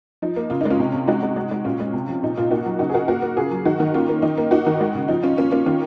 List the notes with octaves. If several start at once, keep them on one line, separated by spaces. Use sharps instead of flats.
F3 D#4
A#3
C#3 F4
G#3 D#4
C#4 F4
C3
C3
G#3 D#4 F#4
G#3
G#3
G#3
A#2 C#4 F4
G#3
C3
F3
A#2 D#4
A#2 F4
A#3 D#4 F#4
F#3
C#3 D#4 F#4
G#4
C#3 F#4 A#4
A#3 F#4 A#4
A#3
C#3 F4 G#4
F#3
D#3 D#4 F#4
D#3
A#3 C#4 F4
A#3
D#3 D#4
A#3
A#3 D#4 F#4
D#3
G#3
C#3
F3 D#4
F3 C#4 F4
A#3 C#4 F4
A#3 C#4 F4
D#3 C#4 F4